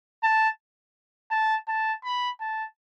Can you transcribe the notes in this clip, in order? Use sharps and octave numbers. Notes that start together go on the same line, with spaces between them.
A5
A5
A5
B5
A5